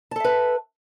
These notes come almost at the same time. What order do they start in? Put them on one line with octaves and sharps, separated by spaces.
A5 A4 E5 B4